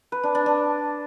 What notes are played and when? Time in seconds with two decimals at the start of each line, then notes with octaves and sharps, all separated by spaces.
0.12 B4
0.23 D4
0.35 D4
0.46 D4